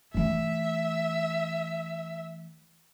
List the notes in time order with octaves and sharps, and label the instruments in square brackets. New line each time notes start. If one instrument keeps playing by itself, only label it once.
[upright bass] E3 A3 [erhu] E5